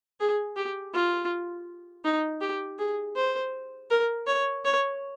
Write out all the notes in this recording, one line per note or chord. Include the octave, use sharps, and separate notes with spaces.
G#4
G4
F4
D#4
G4
G#4
C5
A#4
C#5
C#5